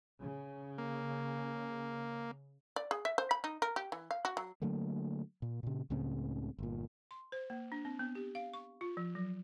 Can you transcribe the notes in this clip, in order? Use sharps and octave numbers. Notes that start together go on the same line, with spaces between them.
C#3
A#3
D5
G#4
E5
C5
B5
D#4
A#4
G4
E3
F5
F#4
F#3
D3 F#3 A3 A#3
A#2
A#2 C#3
C#2 A2 C#3 C4
G1 A#2
C6
C5
A#3
D4
C4
B3
G4
F5
C#6
F4
F3
F#3